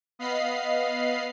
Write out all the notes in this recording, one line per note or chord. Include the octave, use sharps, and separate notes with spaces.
B3 D#5 F5 B5 C7